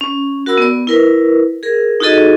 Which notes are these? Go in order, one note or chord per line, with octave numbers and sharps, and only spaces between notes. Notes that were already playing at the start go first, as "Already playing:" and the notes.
C#4
F#4 A#4 F#5 B5 E6
B3 D5
E4 A#4 B4
G#4 A#4
D#4 F4 F#4 G#4 A4 D#5